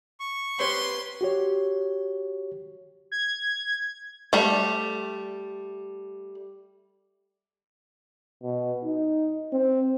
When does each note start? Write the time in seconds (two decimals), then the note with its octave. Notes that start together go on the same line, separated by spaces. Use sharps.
0.20 C#6
0.60 C4 G4 B4 C#5 C6
1.21 F#4 G4 C#5
3.12 G#6
4.33 G3 A3
8.43 B2
8.84 D#4
9.53 C4